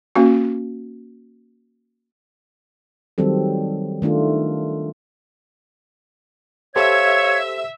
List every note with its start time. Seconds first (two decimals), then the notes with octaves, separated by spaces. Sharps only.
0.16 A#3 C#4 F#4
3.18 D#3 F#3 G3 C4 A4
4.02 D#3 A3 D4 F4
6.76 G4 A4 C5 C#5 E5 F5 G#6